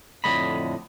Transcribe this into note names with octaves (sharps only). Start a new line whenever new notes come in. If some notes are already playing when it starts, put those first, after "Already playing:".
F2 A2 D3 A3 D#5 B5